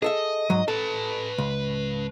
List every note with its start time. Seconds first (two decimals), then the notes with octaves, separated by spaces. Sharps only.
0.02 G#4 A4 D#5 E5
0.50 G#2 F#3
0.68 A4 B4 A5
1.38 C#2